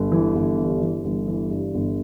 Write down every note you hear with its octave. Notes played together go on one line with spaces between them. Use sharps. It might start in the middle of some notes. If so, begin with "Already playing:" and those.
Already playing: G1
E3
G1
G2
E3
G1
E3
G2
G1